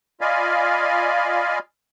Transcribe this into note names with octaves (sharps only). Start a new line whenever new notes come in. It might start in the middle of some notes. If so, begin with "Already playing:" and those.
F4 D5 D#5 F5 G#5 B5